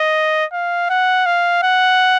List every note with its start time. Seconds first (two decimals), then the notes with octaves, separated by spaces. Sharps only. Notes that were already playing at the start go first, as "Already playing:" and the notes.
Already playing: D#5
0.52 F5
0.90 F#5
1.26 F5
1.63 F#5